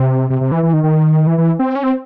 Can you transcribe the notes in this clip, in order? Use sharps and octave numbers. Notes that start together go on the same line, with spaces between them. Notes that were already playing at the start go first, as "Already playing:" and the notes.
Already playing: C3
C3
C3
E3
E3
D#3
D#3
E3
E3
C4
C#4
C4